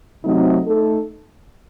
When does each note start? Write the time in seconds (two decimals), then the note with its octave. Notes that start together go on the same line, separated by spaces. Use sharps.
0.24 C3 F#3 A3 C4 D#4
0.66 A3 D#4 A4